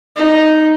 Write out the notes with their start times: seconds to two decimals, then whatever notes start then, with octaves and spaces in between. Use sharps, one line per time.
0.16 D#4